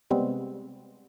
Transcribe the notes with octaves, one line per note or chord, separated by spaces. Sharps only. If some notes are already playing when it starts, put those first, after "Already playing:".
C3 G3 G#3 B3 C4